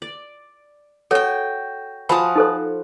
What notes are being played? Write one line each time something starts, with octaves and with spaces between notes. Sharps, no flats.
D5
F#4 A4 C#5 G5 G#5
F3 F#4 G#4 A5 B5 D#6
D#4 A4 C5